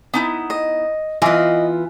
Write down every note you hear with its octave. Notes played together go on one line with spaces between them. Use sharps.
B3 D#4 E4
D#5
E3 B3 F4 D#5 F5